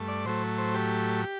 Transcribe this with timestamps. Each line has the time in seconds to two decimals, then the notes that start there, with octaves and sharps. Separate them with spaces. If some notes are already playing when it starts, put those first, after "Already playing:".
Already playing: G2 A3
0.08 D5
0.25 A2 F#3 A3 C5
0.58 C5
0.74 G4